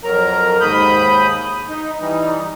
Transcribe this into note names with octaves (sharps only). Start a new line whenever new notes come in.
F2 F#3 A#4 A#5
D#2 G#2 B5 D#6 G6
D#4
E3 G3 D#4